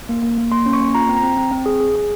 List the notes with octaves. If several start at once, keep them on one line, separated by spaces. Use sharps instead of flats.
A#3
A#3
A#3
A#3 C6
C#4
C#6
A#3
F4 A#5
C4
A#5
C4
C4
C4
G#4
G#4
G#4